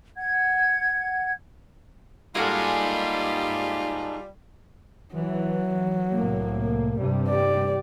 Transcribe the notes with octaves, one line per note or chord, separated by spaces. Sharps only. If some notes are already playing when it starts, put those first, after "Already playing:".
F#5 G#6
G3 A#3 D#4 F4 F#4 G#4 A4
E3 F#3
C2 A2 A#3
G2 C3 G3
G4 D5